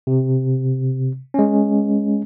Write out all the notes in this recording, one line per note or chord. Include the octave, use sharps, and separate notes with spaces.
C3
G#3 C#4